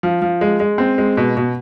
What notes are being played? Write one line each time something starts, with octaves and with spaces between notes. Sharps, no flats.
F3
F3
G#3
G#3
C4
G#3
B2
B2